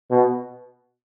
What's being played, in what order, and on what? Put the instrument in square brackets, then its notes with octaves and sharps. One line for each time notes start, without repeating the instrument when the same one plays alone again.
[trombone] B2